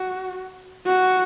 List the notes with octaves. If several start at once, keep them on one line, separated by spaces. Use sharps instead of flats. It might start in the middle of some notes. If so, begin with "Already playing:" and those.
Already playing: F#4
F#4